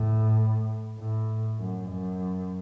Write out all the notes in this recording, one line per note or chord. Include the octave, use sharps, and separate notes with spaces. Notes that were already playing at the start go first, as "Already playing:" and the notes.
Already playing: A2
A2
F#2
F#2